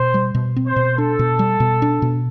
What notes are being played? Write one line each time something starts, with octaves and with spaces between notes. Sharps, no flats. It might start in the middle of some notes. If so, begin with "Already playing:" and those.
Already playing: B2 C5
G3
B2
C4
C5
B2
D4 A4
B2
G3
B2
D4
B2